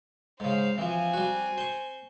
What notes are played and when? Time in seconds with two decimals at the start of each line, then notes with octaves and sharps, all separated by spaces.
0.40 G#2 C#3 C5 F5
0.78 E3 F3 C4 G#5
1.13 G3 F#4
1.58 C5 C#6